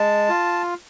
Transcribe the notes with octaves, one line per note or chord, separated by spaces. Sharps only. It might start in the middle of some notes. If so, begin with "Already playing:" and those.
Already playing: G#3 A5
F4